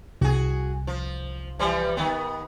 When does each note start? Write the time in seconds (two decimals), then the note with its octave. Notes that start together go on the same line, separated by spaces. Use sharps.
0.21 C2 F#4 G#4
0.87 F3
1.59 E3 F3 G3
1.97 D#3 B3